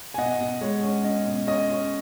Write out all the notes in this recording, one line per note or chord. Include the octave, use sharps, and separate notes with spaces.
G#5
B2 D#5 F#5
B2
G#3 C#5
C#4
C#4 D#5
B2
C#4 D#5
C#4